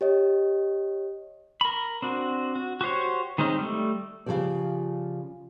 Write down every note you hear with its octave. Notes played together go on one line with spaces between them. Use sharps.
G4 C#5 D#5
A#4 B5
C4 D4 F#4
F#4
F#4 G4 C5 C#5
D#3 G#3 C4 C#4 D#4
G3 A3
C#3 E3 F3 G4 D5